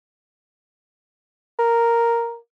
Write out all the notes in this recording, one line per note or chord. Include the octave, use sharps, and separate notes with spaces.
A#4